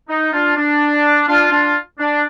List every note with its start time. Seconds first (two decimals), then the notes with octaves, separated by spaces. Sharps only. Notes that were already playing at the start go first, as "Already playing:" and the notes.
0.09 D#4
0.33 D4 F4
0.56 D4
1.28 D4 F4
1.51 D4 F4
1.99 D4